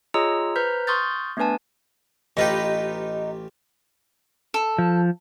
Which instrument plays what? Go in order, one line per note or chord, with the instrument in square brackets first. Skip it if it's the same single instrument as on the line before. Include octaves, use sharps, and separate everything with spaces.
[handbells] F4 G#4 C#5 D#5 A#5 E6
B4 C5 A#5 F6 G6 B6
C6 C#6 D#6 F6 G6 A6
A3 B3 D4 B4 G#5 A5
[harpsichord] A1 F4 G4 [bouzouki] D#4 B4
[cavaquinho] A4
[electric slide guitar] F3